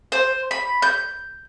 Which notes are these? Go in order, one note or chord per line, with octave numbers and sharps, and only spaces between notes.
C5
B5
G6